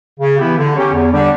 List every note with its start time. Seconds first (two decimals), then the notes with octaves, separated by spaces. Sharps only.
0.19 C#3
0.38 E3 B3 E4 G4
0.56 D3
0.75 F#3 C#4 G4
0.93 E2
1.11 D3 G3 D4